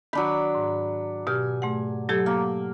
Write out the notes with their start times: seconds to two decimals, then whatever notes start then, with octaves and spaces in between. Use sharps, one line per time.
0.13 D#3 F#3 D4 B5
0.55 G#2
1.27 B2 G4 G#5 F6
1.62 G#2 A3 F#5
2.09 F#3 G4 A4 G#6
2.26 A#3